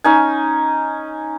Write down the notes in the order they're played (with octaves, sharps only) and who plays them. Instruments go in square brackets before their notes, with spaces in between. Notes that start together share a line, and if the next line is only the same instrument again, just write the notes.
[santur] C#4 D#4 G#5